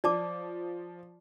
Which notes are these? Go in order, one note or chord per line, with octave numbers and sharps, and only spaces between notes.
F3 D5 A5 D6